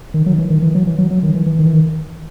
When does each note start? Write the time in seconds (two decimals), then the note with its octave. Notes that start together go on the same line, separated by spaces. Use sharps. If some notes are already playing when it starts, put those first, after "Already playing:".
0.14 D#3
0.26 F#3
0.33 D#3
0.38 E3
0.50 D#3
0.62 E3
0.75 F#3
0.86 E3
0.98 F#3
1.11 F#3
1.23 D#3
1.35 E3
1.46 E3
1.59 D#3
1.66 E3
1.73 D#3